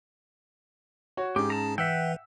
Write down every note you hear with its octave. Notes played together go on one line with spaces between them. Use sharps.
F#4 C#5
G#2 C#4 G4 G#4
A5 A#5
E3 B4 E5 F#5 G5 E6